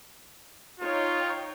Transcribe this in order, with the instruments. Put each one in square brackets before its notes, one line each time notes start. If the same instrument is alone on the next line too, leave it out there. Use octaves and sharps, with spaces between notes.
[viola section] D#4 C#5 G5 [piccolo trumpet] F4